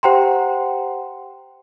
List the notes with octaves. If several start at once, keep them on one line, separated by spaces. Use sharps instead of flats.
G4 C5 F#5 G5 A#5 C6